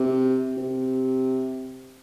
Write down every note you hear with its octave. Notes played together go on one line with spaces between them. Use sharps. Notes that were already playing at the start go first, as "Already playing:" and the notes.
Already playing: C3
C3